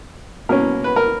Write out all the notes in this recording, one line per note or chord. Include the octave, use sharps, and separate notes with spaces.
B2 A#3 C#4 A#4
B4
A#4